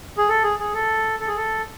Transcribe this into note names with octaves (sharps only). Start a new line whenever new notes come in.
G#4
A4
G#4
G#4
A4
A4
G#4
A4